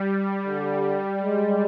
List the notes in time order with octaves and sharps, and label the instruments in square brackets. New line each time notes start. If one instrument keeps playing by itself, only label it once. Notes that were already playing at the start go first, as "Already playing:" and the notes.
Already playing: [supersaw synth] G3
[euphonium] D3
G#3